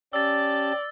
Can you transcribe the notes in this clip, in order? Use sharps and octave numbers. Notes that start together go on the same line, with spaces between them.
C#4 G4 D5 A5 E6 A6